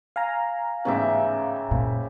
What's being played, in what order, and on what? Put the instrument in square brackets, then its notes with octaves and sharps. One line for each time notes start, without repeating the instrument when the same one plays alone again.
[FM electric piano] F5 G#5 A#5
[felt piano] A1 G#2 B3 [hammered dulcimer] C#3 G4 E5
[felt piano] F#1 [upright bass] A#2